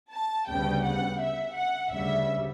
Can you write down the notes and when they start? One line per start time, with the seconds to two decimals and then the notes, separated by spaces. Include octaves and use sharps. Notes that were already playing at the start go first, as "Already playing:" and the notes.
0.12 A5
0.47 D2 C#3 G3 B3 G5
0.83 F#5
1.20 E5
1.56 F#5
1.92 D2 C#3 G3 E5